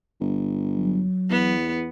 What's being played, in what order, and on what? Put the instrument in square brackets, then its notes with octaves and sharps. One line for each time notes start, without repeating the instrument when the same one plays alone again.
[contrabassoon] G1
[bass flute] F#3
[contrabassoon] E2 [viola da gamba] B3